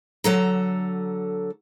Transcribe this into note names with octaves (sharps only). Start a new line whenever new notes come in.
D3 F#3 A4 A#5